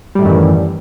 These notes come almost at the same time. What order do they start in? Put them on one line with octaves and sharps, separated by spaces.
G3 A2 D#3 F#2 E3